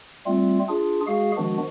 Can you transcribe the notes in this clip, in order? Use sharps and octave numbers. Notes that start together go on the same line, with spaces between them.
G3 A3 C4 F4
D4 F4 G#4
G#3 F#4 G#4 F5
D#3 F3 G#3 B3 D4 F#4